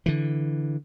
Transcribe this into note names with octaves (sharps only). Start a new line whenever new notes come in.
D3 E3